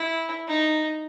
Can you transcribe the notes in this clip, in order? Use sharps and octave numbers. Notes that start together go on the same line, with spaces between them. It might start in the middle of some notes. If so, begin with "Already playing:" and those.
Already playing: E4
D#4